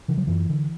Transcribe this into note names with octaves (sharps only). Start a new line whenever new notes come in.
C#3 E3
F#3
F#2 E3
D3